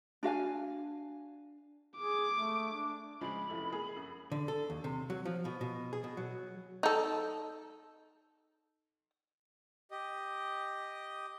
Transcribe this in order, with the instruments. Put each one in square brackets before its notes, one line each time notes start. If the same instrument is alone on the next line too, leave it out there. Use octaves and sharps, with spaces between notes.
[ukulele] D4 F#4 F5 G#5
[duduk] G#4 [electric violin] D6
[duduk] A3
D4
[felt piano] C#3 F3 G#3 [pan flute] B5
[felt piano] F1 E4 A4
A#3 G#4
F#2
[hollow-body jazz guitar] D3
A4
D#2
C3
F#3
F3
B2
B2
G#4
B2
F#3
[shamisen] D#4 A4
[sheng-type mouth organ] G4 D#5